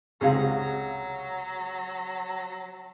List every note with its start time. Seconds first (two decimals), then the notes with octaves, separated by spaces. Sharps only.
0.21 C#2 C3 F#3 G#3 G#4 F5